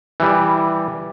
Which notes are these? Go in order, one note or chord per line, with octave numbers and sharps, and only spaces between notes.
E3 G3